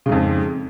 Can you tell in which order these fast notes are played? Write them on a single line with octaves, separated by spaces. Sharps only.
C#3 G#2 F2